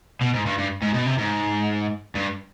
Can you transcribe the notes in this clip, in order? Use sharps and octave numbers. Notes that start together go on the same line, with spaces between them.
B2
G#2
G2
G2
G#2
B2
C3
G#2
G2